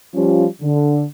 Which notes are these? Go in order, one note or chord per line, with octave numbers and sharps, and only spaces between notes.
F3 G3 C#4 F4 G4
D3